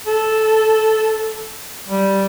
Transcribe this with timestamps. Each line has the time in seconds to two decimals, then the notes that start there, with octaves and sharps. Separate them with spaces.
0.06 A4
1.88 G3